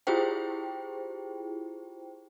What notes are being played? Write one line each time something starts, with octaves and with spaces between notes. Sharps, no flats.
E4 F4 G4 G#4 C5 G5